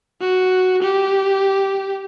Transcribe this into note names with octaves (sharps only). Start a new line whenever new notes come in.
F#4
G4